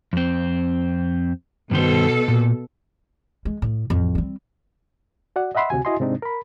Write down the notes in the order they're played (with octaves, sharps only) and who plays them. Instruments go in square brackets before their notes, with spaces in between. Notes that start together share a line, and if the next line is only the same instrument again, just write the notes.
[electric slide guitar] F2 C4
[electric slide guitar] G2 D#3 C5 [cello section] B2 A4
[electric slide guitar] A#2
[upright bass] G#3
A2
A1 F2
G3 C4
[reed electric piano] F#4 D5 F#5
D#5 E5 F#5 B5 C6 E6
D2 C3 F#4 G#5
E4 F#4 D#5 G#5 C6
G#2 C3 G#3 C4 D4 D#4
A#4 B5